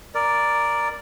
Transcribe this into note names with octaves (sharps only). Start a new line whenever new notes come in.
A#4 D5